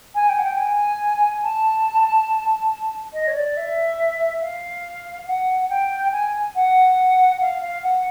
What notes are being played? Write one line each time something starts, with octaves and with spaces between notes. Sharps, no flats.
G#5
G5
F#5
G5
G#5
A5
D#5
C#5
D5
E5
F5
F#5
G5
G#5
F#5
F5
F5
F#5